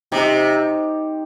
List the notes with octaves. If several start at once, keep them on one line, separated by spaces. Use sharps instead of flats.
C3 D#4 G4